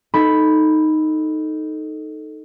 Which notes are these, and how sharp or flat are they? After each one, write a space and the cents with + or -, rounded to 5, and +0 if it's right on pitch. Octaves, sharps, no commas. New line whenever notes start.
D#4 +0 A4 +0 B5 +0